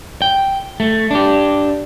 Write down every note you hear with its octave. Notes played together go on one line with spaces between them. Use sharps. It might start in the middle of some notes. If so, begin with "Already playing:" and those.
G5
A3
D4 G4